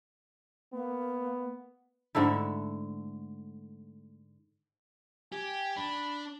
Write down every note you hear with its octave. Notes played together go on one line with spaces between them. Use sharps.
A#3 B3
G#2 D3 A3 E4
G4 G#5
D4 B5